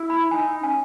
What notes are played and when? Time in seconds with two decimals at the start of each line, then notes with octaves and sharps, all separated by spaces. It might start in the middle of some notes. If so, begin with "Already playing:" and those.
Already playing: E4
0.10 B5
0.31 D#4 G#5
0.62 C#4 G#5